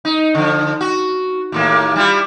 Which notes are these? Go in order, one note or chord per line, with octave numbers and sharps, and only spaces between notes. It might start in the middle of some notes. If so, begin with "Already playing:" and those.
D#4
D3 F3
F#4
D#2 A2 A#3
G3 E4 F4